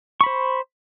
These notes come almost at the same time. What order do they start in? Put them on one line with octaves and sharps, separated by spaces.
C#6 B5 C5